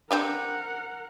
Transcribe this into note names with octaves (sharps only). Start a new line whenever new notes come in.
C4 D4 G4 A#4 F#5